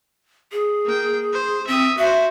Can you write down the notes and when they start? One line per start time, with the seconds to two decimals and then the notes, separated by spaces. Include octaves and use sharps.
0.52 G#4
0.85 A#3 G5
1.33 C5
1.67 C4 E5 D#6
1.98 F#4 C5 E5